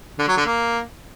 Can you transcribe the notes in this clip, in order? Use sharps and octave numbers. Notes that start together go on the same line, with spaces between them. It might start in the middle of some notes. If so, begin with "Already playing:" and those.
D3
F#3
D3
A#3